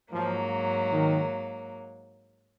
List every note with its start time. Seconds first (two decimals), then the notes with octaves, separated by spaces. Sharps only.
0.12 G#2 F3 F#3 A#3
0.92 D#3